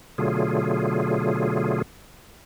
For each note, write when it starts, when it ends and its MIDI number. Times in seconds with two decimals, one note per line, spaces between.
0.18 1.82 47
0.18 1.82 50
0.18 1.82 54
0.18 1.82 57
0.18 1.82 65
0.18 1.82 68